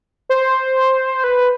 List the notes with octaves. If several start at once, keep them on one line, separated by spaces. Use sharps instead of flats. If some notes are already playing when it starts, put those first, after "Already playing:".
C5
B4